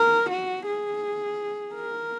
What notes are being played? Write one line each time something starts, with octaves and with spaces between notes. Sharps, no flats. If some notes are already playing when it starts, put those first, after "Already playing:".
Already playing: A#4
F#4
G#4
A#4